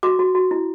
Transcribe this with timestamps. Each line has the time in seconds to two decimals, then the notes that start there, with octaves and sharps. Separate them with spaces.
0.03 F#4 D6
0.19 F#4
0.35 F#4
0.51 E4